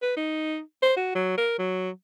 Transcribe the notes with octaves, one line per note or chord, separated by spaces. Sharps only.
B4
D#4
C5
F#4
F#3
A#4
F#3